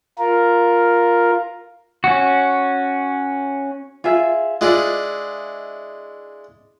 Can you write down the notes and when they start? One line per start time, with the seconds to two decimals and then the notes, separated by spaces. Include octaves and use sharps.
0.18 F4 A#4
2.04 C#4 F#4
4.04 F4 G#4 E5
4.61 G#3 D4 E4 F4